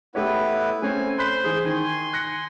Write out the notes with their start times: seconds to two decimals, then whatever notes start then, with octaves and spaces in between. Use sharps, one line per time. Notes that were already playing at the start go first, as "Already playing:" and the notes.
0.15 A3 B3 E4 G4 B4 C#5
0.82 A3 C4 C#4 G#5
1.18 C5 B5 C6 F#6 B6
1.44 E3 G#4
1.65 D#3 G#5 C6
2.13 F#6 A#6 C#7